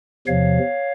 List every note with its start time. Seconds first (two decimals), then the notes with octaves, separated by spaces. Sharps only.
0.27 E2 C3 F3 C#5 F5